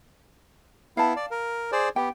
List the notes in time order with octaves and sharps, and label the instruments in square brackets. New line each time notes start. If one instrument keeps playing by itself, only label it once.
[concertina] B3 E4 [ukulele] F5 A5
[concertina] D5
A#4
G#4 C5 D5
[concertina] B3 G4 [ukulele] G5